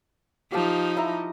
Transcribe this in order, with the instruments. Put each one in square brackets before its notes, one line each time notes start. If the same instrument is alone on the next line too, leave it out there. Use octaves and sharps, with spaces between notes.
[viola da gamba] F3 D#4 [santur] G4 F5 A5
[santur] E4 A#5